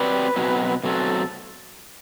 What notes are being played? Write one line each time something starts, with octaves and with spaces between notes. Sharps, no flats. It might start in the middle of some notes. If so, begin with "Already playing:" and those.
Already playing: F#3 C4 G4 B4 D5
B2 F#3 C4
B2 F#3 C4 A4